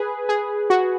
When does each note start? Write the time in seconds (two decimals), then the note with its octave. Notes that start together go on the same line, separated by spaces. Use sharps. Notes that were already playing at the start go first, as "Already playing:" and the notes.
Already playing: G#4 B4
0.29 G#4
0.70 F#4